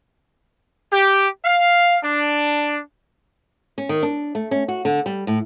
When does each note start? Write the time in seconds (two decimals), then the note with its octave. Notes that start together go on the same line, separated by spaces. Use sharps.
0.91 G4
1.45 F5
2.03 D4
3.78 C#4
3.89 D#3
4.03 D4
4.35 A3
4.51 C#4
4.68 F#4
4.85 D3
5.06 G3
5.27 A2